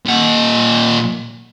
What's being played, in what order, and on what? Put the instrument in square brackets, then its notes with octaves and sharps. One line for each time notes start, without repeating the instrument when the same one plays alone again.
[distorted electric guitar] A#2 F#5